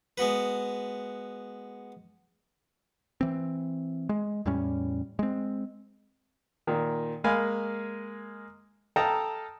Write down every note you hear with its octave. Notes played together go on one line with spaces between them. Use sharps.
G#3 B3 F#4 B4
E3 C4
G#3
E2 A2 G3 C#4
G#3 C4
A#2 D#3
G#3 A#3 F5 G#5 B5
A4 D#5 F5 G5 A5 A#5